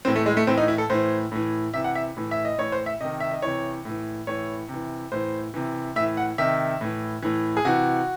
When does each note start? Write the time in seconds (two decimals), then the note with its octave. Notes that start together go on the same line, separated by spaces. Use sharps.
0.05 A2 E3 C4
0.16 A3
0.26 G#3
0.37 A3
0.47 A2 E3 C4
0.58 D#4
0.68 E4
0.78 A4
0.90 A2 E3 C5
1.32 A2 E3
1.74 C3 E3 E5
1.84 F#5
1.95 E5
2.17 A2 E3
2.31 E5
2.45 D#5
2.58 A2 E3 C#5
2.72 C5
2.86 E5
3.01 C3 D#3 D#5
3.20 E5
3.31 D#5
3.42 C3 E3 C#5
3.85 A2 E3
4.27 A2 E3 C#5
4.69 C3 E3
5.12 A2 E3 C5
5.54 C3 E3
5.96 A2 E5
6.00 E3
6.17 F#5
6.38 C3 D#3 E5
6.81 A2 E3
7.22 A2 E3
7.57 G#4
7.65 C3 E3 F#4